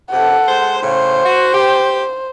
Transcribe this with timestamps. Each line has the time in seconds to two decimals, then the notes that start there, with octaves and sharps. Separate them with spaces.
0.12 F2 C3 A4 F#5
0.48 G#3 C5
0.81 A2 C#3 C5
1.24 F#4
1.53 G4